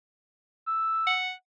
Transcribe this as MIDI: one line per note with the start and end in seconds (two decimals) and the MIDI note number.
0.67 1.15 88
1.07 1.31 78